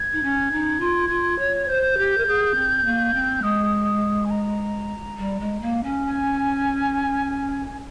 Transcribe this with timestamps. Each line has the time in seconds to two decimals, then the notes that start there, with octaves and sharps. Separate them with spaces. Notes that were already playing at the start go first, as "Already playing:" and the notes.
Already playing: G#6
0.13 D#4
0.23 C#4
0.52 D#4
0.80 F4
1.09 F4
1.39 C#5
1.68 C5 G6
1.98 G4
2.18 A#4
2.26 G#4
2.55 C4
2.85 A#3
3.14 C4
3.42 G#3 D#6
4.24 G#5
4.30 A#5
5.18 G3
5.40 G#3
5.61 A#3
5.84 C#4
6.05 G#5